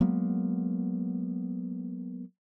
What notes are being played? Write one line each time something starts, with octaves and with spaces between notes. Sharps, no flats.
F#3 G#3 A#3 B3